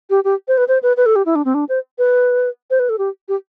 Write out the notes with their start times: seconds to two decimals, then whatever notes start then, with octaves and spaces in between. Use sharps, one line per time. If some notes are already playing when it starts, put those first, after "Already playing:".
0.10 G4
0.24 G4
0.48 C5
0.58 B4
0.68 C5
0.83 B4
0.97 B4
1.06 A4
1.16 G4
1.26 E4
1.35 D4
1.45 C4
1.54 D4
1.69 C5
1.98 B4
2.70 C5
2.79 B4
2.89 A4
2.98 G4
3.28 G4